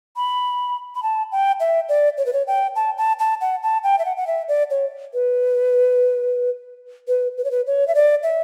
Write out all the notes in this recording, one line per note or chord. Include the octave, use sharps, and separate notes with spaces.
B5
B5
A5
G5
E5
D5
C#5
B4
C#5
G5
A5
A5
A5
F#5
A5
G5
E5
F#5
F#5
E5
D5
C#5
B4
B4
B4
C#5
B4
C#5
E5
D5
E5